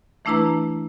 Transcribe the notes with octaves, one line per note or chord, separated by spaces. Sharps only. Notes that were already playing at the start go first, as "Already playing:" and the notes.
E3 A3 D4 E4 B4 A#5